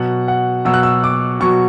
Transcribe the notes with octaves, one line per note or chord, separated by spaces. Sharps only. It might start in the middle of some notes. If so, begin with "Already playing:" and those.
Already playing: B2 F#3 F#5
F#5
B2 F#3 E6
F#6
E6
D6
B2 F#3 C#6